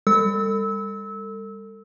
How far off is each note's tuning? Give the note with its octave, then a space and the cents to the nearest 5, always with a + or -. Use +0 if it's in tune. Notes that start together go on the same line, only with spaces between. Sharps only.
G3 +40 A4 +35 E6 -25